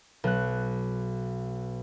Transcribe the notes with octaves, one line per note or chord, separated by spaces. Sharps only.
B1 F#6